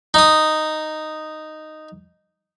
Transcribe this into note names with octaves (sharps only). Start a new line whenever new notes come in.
D#4 D#6